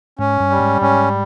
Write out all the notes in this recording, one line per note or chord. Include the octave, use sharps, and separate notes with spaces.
G#2 C#4
G2
G3
G#2
G#2 C#4